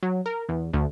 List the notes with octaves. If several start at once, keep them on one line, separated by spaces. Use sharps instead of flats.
F#3
A#4
E2
D2